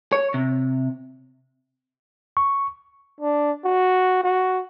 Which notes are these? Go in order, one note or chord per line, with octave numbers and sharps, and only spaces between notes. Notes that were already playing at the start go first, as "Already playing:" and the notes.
C#5
C3
C#6
D4
F#4
F#4